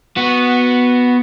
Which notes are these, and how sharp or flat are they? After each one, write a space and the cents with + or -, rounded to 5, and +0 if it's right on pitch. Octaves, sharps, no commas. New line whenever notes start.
B3 +0 F#4 -10